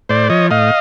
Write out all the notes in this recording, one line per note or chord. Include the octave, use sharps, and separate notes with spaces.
A2 C5 D5
F3 C#5 D#5
A2 D#5 F5